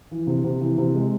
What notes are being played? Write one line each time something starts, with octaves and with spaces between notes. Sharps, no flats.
E3
C3
C3
E3
C3
G#3